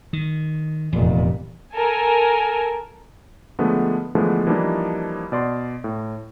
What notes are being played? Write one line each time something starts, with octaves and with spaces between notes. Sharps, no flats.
D#3
F1 E2 A#2
A4 A#4 G#5
D3 F3 G#3 A3 B3
D3 E3 F3 G#3 A3 B3
E3 F3 G3 A#3 D4 D#4
B2 D5 C6
A2